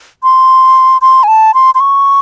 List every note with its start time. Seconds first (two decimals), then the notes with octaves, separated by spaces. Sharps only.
0.23 C6
1.02 C6
1.23 G#5
1.28 A5
1.54 C6
1.75 C6
1.80 C#6